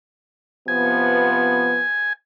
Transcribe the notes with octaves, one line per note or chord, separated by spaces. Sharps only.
C3 F3 B3 G#5